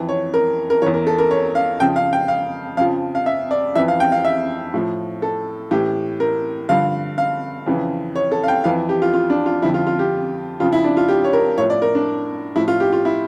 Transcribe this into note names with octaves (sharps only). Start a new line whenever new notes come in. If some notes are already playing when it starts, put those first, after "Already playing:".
Already playing: F2 E3
C#5
A#4
A#4
E2 E3 C#5
A#4
A4
A#4
C#5
F5
F2 C#3 F3 G5
F5
G5
F5
F2 C#3 F3 F5
F5
E5
D5
F2 E3 E5
F5
G5
F5
E5
A2 F3
A4
A2 E3 G4
A#4
G2 D3 F3 F5
F5
F2 C#3 E3
C#5
A4
F5
G5
F2 E3 F5
G4
F4
F4
D4
F4
F2 D3 F3 E4
F4
F4
G4
F2 C#3 F3 F4
E4
D4
F4
G4
C#5
A#4
A2 F3 C#5
D5
A#4
D4
A2 F3 E4
F4
G4
F4
E4